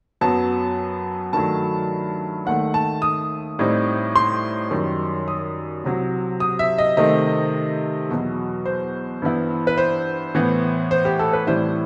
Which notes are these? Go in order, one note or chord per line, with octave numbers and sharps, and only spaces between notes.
F#2 F#3 B3 A5
G2 D#3 F#3 A3 A5
D#2 D#3 A3 F#5
A5
D#6
A2 G3 C4 D#4
C6
F#2 D#3 G3
D#6
C2 C3 F#3
D#6
E5
D#5
C3 D#3 A3 C4 D#5
E2 B2 F#3
C5
G2 E3 B3 E4
B4
C5
A2 E3 B3
C5
G4
A4
B4
A2 E3 G3 C4 E4 C5